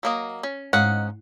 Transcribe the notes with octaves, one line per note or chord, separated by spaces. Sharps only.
F#3 A#3 D#5
C#4
G#2 C#4 D#4 F5 F#5